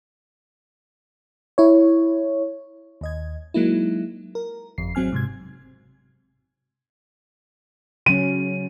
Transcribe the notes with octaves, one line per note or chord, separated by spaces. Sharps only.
E4 C#5
D#2 D#5 G#6
F#3 G#3 A#3 D#4 E4
A#4
G1 F2 C7
G#1 F#3 C4 G#5 F6
G#2 C3 G#6
C#3 F#3 C#4 D#7